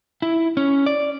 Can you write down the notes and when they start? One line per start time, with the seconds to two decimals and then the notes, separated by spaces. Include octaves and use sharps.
0.22 E4
0.57 C#4
0.86 D5